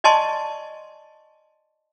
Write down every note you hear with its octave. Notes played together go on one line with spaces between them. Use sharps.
D5 D#5 G#5 A5 C6 C#6